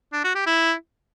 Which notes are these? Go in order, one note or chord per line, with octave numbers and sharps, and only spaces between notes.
D4
F#4
G4
E4